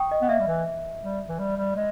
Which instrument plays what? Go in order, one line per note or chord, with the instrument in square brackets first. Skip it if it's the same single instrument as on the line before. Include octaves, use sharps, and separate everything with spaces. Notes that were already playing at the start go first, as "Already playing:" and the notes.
Already playing: [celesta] G5 C#6 D#6
D#5
[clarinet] B3
[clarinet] A#3 [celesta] E5
[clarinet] G3
E3
G3
E3
G3
G3
G#3